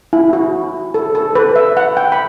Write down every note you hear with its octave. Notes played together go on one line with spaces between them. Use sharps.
E4
F#4
A4
A4
B4
E5
F#5
G5
B5